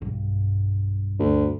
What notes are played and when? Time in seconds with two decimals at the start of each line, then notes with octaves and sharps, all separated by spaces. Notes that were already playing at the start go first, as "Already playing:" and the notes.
0.01 B1 G2
1.20 D2